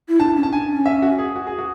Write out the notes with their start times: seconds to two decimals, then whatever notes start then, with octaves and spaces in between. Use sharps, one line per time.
0.08 E4
0.20 D4 A5
0.36 C#4
0.43 A5
0.53 D4 G#5
0.69 C#4
0.86 E5
1.02 F#4
1.19 G#4
1.36 F#4
1.47 G#4
1.59 F#4